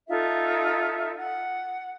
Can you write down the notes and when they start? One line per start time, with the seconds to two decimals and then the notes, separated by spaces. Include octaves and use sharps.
0.08 D#4 F4 A4 E5
1.17 F#5